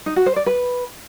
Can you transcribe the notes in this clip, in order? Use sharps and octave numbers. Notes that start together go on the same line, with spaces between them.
D#4
F#4
C5
D5
B4